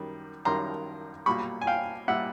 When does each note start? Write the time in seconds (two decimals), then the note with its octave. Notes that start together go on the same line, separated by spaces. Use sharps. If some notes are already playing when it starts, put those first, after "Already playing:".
Already playing: F#2 D#3 G3
0.45 F#2 D#3 G3 A#5 C6
1.26 B1 A#2 G3 B5 C#6
1.61 G#5
1.67 F5 G5
2.08 A#2 G3 E5 F#5